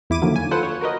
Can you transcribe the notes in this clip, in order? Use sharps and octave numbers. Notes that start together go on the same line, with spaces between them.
E2 E4 D6 D#7
D3 D#3 F3 F#3 A#3
G#5
F4 A4 B4 C5 F#5
C#5
F#4 A#4 B4 D#5